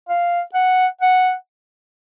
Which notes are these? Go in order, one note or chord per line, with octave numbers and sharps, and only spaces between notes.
F5
F#5
F#5